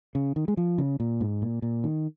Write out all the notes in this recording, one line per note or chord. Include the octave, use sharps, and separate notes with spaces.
C#3
D#3
G#3
F3
C#3
A#2
G#2
A#2
A#2
D#3